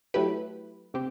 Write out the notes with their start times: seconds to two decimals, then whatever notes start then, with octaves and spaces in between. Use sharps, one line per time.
0.14 F#3 A3 E4 G4 B4
0.94 C3 C4 G4